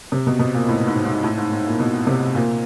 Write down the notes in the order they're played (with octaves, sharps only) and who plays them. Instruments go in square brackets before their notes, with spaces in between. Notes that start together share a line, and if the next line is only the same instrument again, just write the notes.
[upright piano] C3
B2
B2
A#2
A2
G#2
G#2
A2
G#2
G#2
A#2
B2
C3
A#2